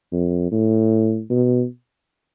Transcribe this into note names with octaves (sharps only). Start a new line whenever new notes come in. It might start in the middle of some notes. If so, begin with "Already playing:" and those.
F2
A2
B2